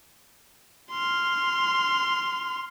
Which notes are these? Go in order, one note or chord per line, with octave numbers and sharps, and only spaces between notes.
C6 F6